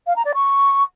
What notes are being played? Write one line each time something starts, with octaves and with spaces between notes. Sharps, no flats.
F5
A#5
D5
C#6